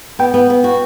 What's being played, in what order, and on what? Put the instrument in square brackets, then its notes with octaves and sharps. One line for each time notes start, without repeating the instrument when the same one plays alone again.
[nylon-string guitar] B3 [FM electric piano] G5
[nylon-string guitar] B3
B3
F#4